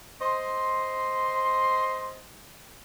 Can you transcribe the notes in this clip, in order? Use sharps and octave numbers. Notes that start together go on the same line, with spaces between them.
C5 D#5 C6